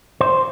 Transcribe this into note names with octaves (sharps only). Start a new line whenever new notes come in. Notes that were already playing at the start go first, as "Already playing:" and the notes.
C5